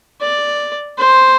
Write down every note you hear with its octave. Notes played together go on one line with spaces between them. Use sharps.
D5
C5